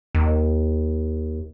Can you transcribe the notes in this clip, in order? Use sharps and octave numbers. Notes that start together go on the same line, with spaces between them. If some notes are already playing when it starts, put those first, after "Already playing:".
D#2